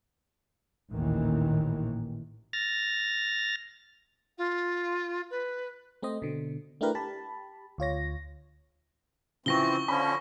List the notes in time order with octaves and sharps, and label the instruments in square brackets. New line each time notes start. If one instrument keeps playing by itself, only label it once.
[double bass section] A1 D#2 A#2 D#3 E3
[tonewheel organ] F6 A6 A#6
[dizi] F4
B4
[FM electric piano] A3 C4 C5 D#5
B2 D3
A3 D4 E4 G4 A#4 B4
G4 A5 B5
D2 F4 C#5 A#6
[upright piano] C#3 F3 E4 [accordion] E3 C4 [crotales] C#6 A#6 G7
[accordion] D3 F3 C#4 [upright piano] B5